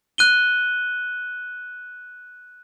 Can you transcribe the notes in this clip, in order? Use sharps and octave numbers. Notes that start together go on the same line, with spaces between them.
F#6 D#7 G7